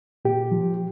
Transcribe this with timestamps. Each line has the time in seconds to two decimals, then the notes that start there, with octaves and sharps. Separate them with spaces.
0.25 A#2 G4
0.51 F3